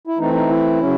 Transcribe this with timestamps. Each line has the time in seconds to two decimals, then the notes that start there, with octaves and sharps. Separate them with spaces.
0.07 E4
0.18 E3 A3 C4 D#4
0.33 D#4
0.49 E4
0.80 C#3 F#3 C#4